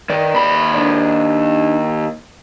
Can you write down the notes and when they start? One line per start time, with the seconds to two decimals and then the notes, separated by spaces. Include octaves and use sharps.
0.10 D#3 B4 D5
0.36 D#2 B5
0.74 D4 D#4 D5